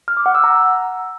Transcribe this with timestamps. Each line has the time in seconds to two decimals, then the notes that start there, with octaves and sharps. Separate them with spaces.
0.08 F6
0.17 D6
0.26 F#5
0.35 E6
0.44 A#5